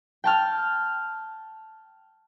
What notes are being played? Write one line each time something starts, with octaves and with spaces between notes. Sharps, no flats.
G5 A5 F6